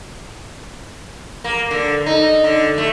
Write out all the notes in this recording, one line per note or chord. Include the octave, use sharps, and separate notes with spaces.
A#3
D3
D#4
D3
A3